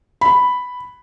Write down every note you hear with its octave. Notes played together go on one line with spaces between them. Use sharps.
B5